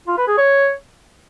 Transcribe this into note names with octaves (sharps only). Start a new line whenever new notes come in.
F4
B4
G#4
C#5